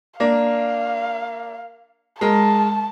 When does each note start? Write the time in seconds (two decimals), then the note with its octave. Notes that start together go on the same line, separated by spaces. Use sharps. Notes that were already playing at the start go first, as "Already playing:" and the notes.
0.20 A#3 D4 F5
2.21 G#3 A#4 A5